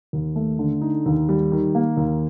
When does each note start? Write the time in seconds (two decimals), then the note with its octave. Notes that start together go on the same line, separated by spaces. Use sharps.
0.13 D#2
0.36 A3
0.59 D3
0.81 D#4
1.06 D#2
1.29 G3
1.52 D#3
1.75 A#3
1.97 D#2